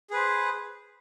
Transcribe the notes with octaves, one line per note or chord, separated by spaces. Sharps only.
G#4 B4 C5